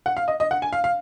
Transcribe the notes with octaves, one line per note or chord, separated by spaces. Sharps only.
F#5
F5
D#5
D#5
F#5
G#5
F5
F5